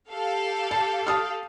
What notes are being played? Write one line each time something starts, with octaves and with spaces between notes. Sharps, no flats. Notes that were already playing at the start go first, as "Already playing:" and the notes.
G4 A4 F5
A5
A5 D#6 F6